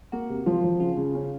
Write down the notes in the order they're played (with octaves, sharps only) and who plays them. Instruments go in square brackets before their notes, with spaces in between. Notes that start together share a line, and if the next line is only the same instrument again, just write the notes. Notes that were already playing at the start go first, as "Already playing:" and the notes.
[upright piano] A#3 [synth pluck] F#4
[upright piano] C3
[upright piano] F3 [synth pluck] F4
[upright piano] F3
[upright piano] C#3 [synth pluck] F4
[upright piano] C#3
C#4